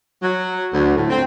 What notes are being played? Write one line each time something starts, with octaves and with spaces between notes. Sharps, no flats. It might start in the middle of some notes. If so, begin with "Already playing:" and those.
F#3
D2
A2
C4